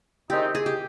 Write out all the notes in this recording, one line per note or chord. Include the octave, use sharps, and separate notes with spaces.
C3 D#3 G#3 C4 D#4 G4
G#4
G4